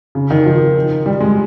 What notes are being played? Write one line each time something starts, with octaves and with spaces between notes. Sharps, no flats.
C#3
D#3
F3
G3
G#3